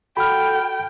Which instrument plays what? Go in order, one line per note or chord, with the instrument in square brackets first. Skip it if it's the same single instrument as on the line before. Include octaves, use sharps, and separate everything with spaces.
[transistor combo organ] F#4 A4 [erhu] G5 [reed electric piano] B5 F6